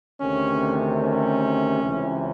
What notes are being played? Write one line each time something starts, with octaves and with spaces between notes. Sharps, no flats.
D2 C3 D#3 C#4
C#4
C#2 C3 E3